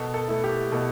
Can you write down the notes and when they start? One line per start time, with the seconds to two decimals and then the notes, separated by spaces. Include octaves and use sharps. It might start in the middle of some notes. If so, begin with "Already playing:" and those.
Already playing: B2 A4
0.14 A4
0.28 A3 E4
0.44 G4
0.72 B2 A4